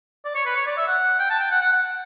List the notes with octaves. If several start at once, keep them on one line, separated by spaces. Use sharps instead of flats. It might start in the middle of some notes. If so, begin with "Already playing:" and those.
D5
C#5
B4
C#5
D5
E5
F#5
G5
A5
G5
F#5
F#5
F#5